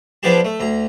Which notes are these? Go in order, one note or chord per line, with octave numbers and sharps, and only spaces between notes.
F3 B3 D4 G4 G#4 A5
A3
D2 A#5